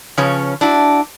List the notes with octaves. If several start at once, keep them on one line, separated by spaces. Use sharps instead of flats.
C#3 F3 C#4 B4 C#5
D4 E4 F#4